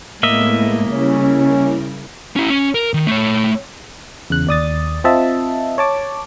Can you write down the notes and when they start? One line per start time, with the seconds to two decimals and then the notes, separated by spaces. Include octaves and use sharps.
0.23 A2 G#3 A#3 B3 E4 D#5 E5
0.91 C#3 G3 C#4 E4 A#4
2.36 C#4 E4
2.50 C#4
2.75 A#4
2.94 D#3
3.07 A3 C#5
4.30 E2 C#3 F#6
4.47 D#2 D5 D#6 A6
5.04 C4 F4 D#5 E5 A5
5.78 C#5 A5 D6